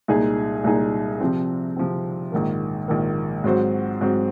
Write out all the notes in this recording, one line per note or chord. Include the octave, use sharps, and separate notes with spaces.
C2 A#2 G#3 D#4 G#4
C2 A#2 G#3 D#4 G#4
C3 F3 C4
C3 F3 C4
A#1 G#2 D#3 A#3
A#1 G#2 D#3 A#3
G#2 F#3 C4 F#4 C5
G#2 F#3 C4 F#4 C5